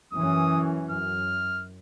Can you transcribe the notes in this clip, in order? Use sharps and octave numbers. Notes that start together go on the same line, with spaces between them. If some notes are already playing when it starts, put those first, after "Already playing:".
F#2 E3 C#4 D#6
F#2 F6